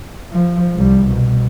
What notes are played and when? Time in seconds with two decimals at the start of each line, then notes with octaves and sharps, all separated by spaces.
0.32 F3
0.75 C2 G3
1.08 B2